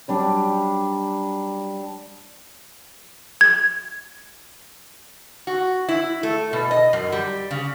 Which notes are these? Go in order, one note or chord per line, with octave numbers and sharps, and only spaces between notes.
F#3 G3 D4
G#6
F#4
E4
A3
B2
D#5
F#2
G3
C#3